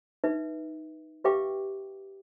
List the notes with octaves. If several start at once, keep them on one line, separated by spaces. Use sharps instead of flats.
D#4 B4 E5
G4 B4 E5 F5 G5 D6